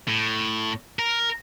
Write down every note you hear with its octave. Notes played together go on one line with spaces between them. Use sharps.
A2
A#4